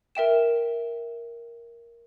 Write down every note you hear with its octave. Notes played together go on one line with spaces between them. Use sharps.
A#4 E5 G5 E7